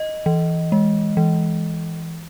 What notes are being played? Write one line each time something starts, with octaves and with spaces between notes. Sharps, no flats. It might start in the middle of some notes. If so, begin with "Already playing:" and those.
Already playing: D#5
E3
G#3
E3